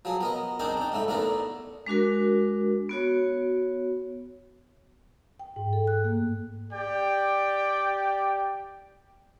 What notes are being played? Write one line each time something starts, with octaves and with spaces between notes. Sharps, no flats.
F3 F#3 G#4
B3 A#4 D#5
C4 D4 D#4 G#4 A#4
D4 D#4
G#2 C#3 A3 E4
E2 A3 D4 E4 A#4
G#3 D4 F#4 A#4
B3 F#4 C#5
G5
G#2
A4
F#6
A#3
G4 D5 G5